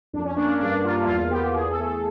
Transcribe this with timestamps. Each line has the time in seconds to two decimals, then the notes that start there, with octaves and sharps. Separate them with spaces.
0.13 F2 D4
0.25 C#4
0.36 A#3 D4
0.49 C#4
0.60 G2 D4
0.84 A#3 F4
1.02 E4
1.07 E2 F4
1.30 B3 G4
1.54 E2 G#4
1.70 A4
1.78 A3
1.85 A4